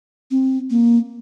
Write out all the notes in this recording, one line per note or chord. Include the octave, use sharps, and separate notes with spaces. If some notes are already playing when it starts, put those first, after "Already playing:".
C4
A#3